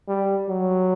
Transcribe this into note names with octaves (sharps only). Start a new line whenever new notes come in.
G3
F#3